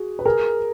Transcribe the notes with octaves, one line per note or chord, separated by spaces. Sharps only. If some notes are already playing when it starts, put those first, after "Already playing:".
Already playing: F#4 G#4
B4
G#4 A#4